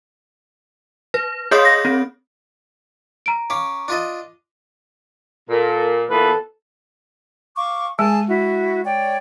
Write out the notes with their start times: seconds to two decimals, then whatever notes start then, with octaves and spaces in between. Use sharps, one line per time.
1.14 B4
1.51 G#4 C#5 D#5 F5 C6 D#6
1.65 A#6
1.85 C4
3.26 A#5 D7
3.50 C#4 F5 D6
3.88 D4 F4 D#5
5.49 A#2 A4
6.10 A#2 E3 B3 A4 B4
7.57 F5 C#6 D6
7.99 G#3 G#4 G#5 A5
8.28 E4 F#4
8.84 C#5 D5 G5